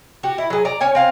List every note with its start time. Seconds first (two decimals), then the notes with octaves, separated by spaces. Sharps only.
0.23 F#4 G4
0.38 E4
0.50 F#3 G#4
0.65 D5 A#5
0.81 C#4 C#5 G#5
0.95 C4 F5 G#5